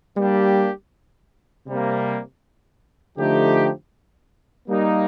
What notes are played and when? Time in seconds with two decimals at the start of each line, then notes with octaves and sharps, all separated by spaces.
0.17 G3 A#3 D4 G4
1.67 C3 G3 A#3
3.18 D3 F3 A3 D#4 G4
4.68 G3 A#3 D#4